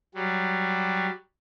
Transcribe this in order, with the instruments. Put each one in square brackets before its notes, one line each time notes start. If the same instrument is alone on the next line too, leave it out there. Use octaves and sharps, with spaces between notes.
[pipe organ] F#3 G3